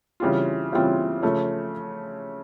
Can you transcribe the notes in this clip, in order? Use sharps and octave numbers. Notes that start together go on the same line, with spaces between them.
C#3 E3 G3 C4 F4
C#3 E3 G3 C4 F4
C#3 F3 A3